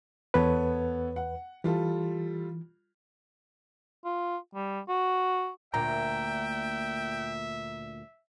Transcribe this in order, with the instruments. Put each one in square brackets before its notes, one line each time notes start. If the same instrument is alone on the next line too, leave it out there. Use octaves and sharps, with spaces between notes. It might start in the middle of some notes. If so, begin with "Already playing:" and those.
[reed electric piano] E2 B4 [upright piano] B3 A4 C#5
[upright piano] F#5
[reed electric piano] E3 [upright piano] G3 F4 A4
[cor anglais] F4
G3
F#4
[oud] D2 A#2 [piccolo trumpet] E5 [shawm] G5 [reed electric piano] A#5